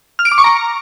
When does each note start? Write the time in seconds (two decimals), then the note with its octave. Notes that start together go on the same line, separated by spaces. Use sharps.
0.19 F6
0.25 D7
0.32 D6
0.38 C#6
0.44 A#5